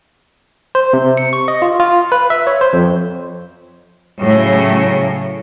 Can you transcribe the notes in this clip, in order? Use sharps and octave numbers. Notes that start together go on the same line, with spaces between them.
C5
C3
C#7
C#6
D#5
F4
F4
B4
E5
C#5
C5
F2
A2 C#3 F#3